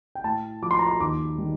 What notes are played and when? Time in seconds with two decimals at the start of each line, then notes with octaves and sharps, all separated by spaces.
0.15 G5
0.24 A2 A5
0.62 F3 D6
0.71 C6
0.79 A#5
0.87 C6
1.00 D#2 D6
1.38 D#3 G3